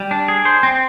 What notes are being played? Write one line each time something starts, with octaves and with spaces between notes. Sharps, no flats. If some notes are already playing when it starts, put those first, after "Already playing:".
Already playing: G3
D4
G#4
C5
C4